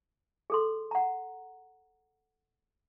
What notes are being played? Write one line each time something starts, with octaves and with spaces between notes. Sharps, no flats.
G#4 A4 C6
F#5 A#5